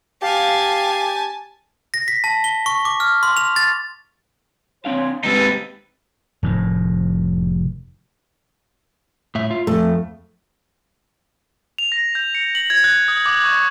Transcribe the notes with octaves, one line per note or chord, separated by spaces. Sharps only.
G4 F5 G#5 A5
A#6
B6
A5
G7
C#6
D6
F6
C6
F7
A6
C4 D4 C#5 F5 C6
D#2 G#3 C4 D#4 G4 A4 B4
F1 A2 D#3
A2 E5
F4 E5
F2 A3
F7
A#6
G6
C#7
F#7
G#6
F#6
D#6
D6
C#6